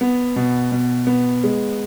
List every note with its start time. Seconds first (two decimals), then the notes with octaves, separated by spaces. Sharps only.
0.01 B3
0.36 B2
0.72 B2
1.07 B3
1.44 G#3